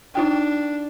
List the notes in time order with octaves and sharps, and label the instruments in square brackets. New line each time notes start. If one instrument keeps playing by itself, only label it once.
[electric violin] D4 [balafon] D#4 F4 G5